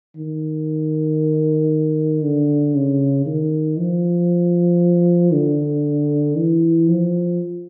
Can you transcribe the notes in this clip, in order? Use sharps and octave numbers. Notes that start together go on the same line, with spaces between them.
D#3
D3
C#3
D#3
F3
D3
E3
F3